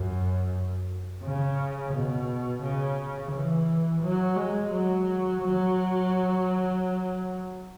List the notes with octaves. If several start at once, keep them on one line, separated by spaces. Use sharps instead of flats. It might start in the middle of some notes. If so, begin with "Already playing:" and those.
Already playing: F#2
C#3
B2
C#3
E3
F#3
G#3
F#3
F#3